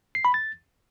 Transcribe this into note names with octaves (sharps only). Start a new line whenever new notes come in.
C7
B5
A6